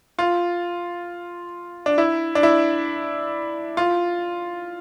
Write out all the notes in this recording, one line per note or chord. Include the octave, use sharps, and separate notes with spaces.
F4
D4
E4
D4
E4
F4